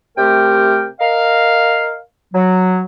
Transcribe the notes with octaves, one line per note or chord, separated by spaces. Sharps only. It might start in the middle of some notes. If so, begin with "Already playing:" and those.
C3 A3 G4 A#4 G5
A#4 D#5 F5
F#3